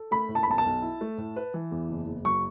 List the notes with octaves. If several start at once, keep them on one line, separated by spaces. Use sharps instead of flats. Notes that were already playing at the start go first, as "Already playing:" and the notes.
Already playing: A4
A3 B5
A2
A5
B5
B1 A5
A5
B1
E4
A3
A2
B4
E3
E2
F#1
F#1
F#3 C#6